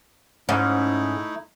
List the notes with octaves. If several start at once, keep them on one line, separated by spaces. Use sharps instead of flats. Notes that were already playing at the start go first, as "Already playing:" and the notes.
G#2 A3 C#4 D#4 E4